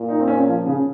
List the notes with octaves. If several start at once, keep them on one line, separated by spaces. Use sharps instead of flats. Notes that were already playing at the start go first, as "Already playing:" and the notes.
Already playing: A#2
D#4
C4
C#4
F3
C#3